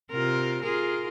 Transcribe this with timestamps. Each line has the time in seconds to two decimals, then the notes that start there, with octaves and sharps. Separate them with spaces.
0.11 C3 F4 A#4
0.62 F4 G#4 A#4